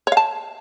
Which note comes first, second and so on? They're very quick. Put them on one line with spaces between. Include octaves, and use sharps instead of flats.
C#5 F5 A5